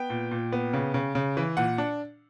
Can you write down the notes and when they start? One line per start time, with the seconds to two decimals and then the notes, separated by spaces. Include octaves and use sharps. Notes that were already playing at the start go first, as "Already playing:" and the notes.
Already playing: B3 G5
0.10 A#2
0.31 A#2
0.52 B3
0.73 C#3
0.94 C#3
1.15 C#3
1.37 E3
1.57 A#2 F#5
1.78 D4